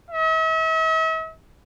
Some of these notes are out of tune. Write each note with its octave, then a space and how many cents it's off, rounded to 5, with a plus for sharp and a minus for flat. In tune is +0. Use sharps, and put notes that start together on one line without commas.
E5 -45